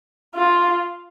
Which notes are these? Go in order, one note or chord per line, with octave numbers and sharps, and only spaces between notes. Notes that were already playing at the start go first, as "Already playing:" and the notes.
F4